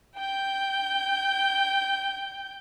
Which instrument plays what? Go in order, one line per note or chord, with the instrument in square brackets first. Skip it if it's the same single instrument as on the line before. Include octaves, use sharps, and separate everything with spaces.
[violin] G5 G6